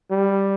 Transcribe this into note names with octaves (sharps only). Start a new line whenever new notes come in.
G3